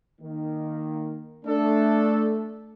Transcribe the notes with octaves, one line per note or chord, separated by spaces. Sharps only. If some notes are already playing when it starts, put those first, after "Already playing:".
D#3 A#3
A3 D4 A4